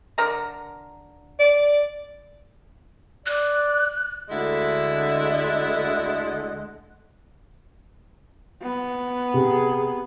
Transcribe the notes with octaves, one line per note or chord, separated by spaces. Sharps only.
D3 A#4 A#5
D5
D5 F#6
D2 D3 G#3 E4 A4 F#5
B3
C3 G#4